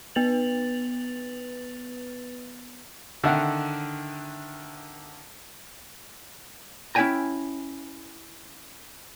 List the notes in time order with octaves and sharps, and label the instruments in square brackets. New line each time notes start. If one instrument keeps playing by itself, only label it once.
[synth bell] B3 B4 A6 F7 F#7
[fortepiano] D3 D#3 E5 F#5
[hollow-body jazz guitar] C#4 E4 E5 G5 G#5 A#5